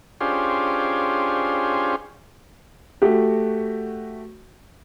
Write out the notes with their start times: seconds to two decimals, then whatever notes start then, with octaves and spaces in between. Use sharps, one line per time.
0.21 C#4 D4 F4 G4 G#4 C5
3.02 A3 F#4 G4